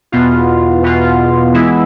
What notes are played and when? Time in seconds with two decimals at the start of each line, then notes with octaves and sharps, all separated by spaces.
0.12 E2 B2 B3 F4
0.83 E2 B2 B3 F4
1.54 E3 G#3 B3 E4